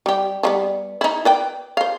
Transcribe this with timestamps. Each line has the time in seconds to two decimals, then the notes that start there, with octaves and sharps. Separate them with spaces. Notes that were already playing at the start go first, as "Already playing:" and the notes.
0.06 G3 G4
0.43 F3 G3 B3
1.01 D#4 E4
1.25 B4 D5 G5
1.77 C5 F5